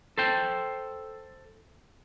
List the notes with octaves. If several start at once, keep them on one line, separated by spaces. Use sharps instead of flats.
A4 C5 G5